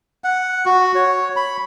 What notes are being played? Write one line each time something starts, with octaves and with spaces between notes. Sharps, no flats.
F#5
F#4
C#5
B5